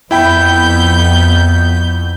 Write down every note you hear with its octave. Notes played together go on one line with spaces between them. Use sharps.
F2 B3 E4 G5 B5 G6